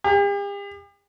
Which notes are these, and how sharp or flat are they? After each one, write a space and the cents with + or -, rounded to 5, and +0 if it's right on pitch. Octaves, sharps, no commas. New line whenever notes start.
G4 +45